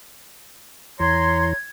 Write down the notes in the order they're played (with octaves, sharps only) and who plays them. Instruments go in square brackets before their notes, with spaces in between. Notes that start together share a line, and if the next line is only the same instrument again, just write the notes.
[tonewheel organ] E2 E3 [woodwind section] C#5 A#5 C6 [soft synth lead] G#6